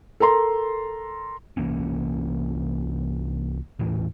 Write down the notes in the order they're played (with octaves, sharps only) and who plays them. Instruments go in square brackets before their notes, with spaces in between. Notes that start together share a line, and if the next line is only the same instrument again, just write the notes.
[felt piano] A4 A#4 A#5 C6
[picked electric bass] C2 E3 A#3 C#4
D#1 A2 E3